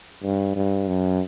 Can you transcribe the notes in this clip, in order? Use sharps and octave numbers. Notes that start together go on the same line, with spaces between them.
G2
G2
F#2